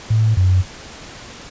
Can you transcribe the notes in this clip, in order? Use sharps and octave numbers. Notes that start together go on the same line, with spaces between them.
A2
F#2